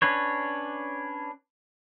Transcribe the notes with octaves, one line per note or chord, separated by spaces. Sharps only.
C#4 D4 B4 C#5